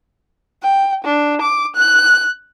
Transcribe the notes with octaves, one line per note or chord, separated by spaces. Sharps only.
G5
D4
D6
F#6